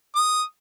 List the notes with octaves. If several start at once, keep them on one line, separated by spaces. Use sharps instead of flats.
D#6